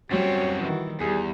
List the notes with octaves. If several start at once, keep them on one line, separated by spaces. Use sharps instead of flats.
F#2 F#3 G3 C4 F#4 C#5
D#3 E3
E2 G3 G#4